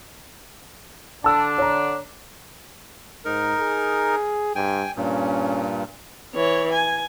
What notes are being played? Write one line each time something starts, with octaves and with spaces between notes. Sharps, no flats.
D3 D4 A5 E6
C#5 A#5
G#2 D#4 A#4
G#4
G2 G5 G#5
G2 A#2 C#4
E3 C#5
G#5